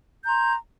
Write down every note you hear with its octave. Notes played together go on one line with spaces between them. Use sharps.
A#5 C6 G6